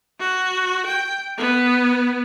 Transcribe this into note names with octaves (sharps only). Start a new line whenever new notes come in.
F#4
G5
B3